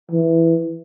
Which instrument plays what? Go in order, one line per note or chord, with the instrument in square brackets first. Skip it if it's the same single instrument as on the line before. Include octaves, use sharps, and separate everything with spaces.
[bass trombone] E3